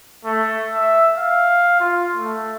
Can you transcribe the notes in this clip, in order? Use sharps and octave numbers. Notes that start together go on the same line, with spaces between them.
A3
E5
F5
F4
A3